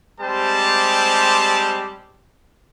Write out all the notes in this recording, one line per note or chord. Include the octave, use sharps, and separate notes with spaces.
G3 G#3 C4 G4 C5 A5